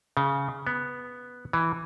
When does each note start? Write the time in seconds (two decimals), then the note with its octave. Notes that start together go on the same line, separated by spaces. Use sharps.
0.17 C#3
0.67 B3
1.53 E3